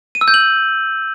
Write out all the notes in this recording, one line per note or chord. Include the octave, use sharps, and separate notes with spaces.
D#7
E6
G6
F#7